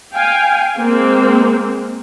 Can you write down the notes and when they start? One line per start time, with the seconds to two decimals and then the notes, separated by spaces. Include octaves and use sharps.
0.11 F5 G5 G#5
0.79 G#3 A#3 C4